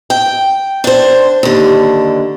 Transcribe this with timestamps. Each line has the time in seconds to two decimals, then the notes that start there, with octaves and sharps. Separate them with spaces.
0.10 G5
0.84 D4 C5
1.43 D#2 D3